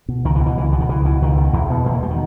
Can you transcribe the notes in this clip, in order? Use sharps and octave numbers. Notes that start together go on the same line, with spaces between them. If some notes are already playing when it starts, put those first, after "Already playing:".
B2
C#2 D#3
E3
B2
E3
C#2 E3
B2 E3
D#3
C#2 E3
B2 E3
C#2 D#3
B2
E2 E3
B2 B3
E2 G#3
A#3
B2 G3
D#3